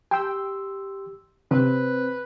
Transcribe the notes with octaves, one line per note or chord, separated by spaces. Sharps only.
G4 G5 C6 E6
C3 C4 B4 C5